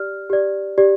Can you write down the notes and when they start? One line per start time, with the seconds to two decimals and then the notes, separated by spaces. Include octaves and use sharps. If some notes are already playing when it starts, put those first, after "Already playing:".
Already playing: G4 D5 F6
0.30 G4 D5
0.78 G4 D5